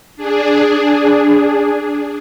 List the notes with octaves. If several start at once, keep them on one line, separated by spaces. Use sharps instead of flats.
D4 G#4